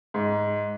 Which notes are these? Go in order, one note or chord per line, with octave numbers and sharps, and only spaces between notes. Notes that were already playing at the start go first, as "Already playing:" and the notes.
G#2